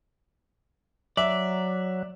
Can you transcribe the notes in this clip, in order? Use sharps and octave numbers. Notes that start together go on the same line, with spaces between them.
F#3 D5 E5